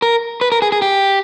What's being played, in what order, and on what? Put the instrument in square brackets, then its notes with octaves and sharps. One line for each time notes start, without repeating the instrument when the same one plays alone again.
[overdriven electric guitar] A#4
B4
A#4
G#4
G#4
G4